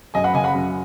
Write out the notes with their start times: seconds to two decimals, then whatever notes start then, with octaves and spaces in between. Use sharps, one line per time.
0.14 F#2 D#5 G#5
0.24 F#5 B5
0.34 C#3 D#5 G#5
0.44 F#5 B5
0.55 F#2